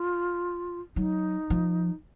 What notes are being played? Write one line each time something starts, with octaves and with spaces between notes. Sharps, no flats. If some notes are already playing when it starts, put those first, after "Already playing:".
Already playing: F4
F#3 D#4
F3